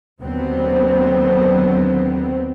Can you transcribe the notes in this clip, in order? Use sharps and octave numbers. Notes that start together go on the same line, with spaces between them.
D#2 D3 F#3 B3 C4